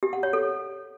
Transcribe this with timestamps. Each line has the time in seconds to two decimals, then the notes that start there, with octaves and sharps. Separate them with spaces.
0.03 G4
0.13 F#5
0.23 C#5
0.33 A4